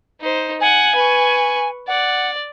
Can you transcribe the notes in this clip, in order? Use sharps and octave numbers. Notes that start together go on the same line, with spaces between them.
D#4 C5
F#5 G#5
B4 C#6
D5 F#5